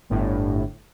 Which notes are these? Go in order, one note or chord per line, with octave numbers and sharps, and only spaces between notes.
G1 A2